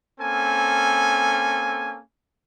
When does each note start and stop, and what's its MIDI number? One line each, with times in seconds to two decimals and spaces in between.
0.20 2.00 58
0.20 2.00 60
0.20 2.00 61
0.20 2.00 69
0.20 2.00 80